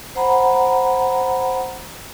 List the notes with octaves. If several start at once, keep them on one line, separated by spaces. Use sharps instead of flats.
C5 F#5 A#5 B5